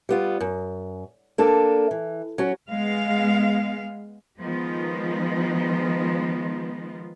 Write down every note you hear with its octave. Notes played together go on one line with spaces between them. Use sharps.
G3 B3 F4
F#2
A#3 D4 A4
E3
F#3 C#4 F#4
G#3 B3 F5
D#3 F3 G#3 B3 D#4 F4